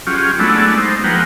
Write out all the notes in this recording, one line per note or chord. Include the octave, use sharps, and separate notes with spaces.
F#3 C#4 F4 G4 G#4
F#3 G#3 A3 B3 D4 E4
D#4 C5
F3 G#3 A#3 B4 F#5 G5